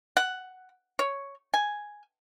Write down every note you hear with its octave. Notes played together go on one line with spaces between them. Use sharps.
F#5
C#5
G#5